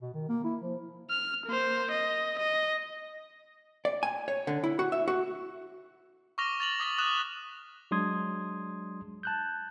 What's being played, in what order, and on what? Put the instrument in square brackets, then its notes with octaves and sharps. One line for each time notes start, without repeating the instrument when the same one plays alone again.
[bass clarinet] B2
D#3
A#3
E4
F3
[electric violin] F6
A#3 C5
D#5
D#5
[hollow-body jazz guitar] D5
G#5
C#5
D3
E4
F#4
E5
F#4
[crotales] C#6 D6 F6 A#6 F7 G7
A6 F7 F#7
D6 D#6 A#6 B6 G7
D6 D#6 F#6 E7 F7
[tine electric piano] F#3 G#3 D4 C6 D#6 G#6
A5 F#6 G6